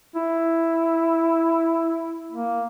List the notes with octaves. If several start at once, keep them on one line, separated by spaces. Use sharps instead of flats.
E4
A#3